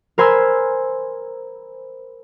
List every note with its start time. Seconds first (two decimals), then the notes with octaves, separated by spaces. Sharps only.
0.18 A#4 C5 G#5 B5 C6 E6